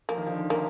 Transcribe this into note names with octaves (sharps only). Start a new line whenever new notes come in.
F3 A#3
D#3
D3 F3
A#3